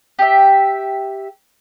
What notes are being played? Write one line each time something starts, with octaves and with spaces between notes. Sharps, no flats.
G4 E5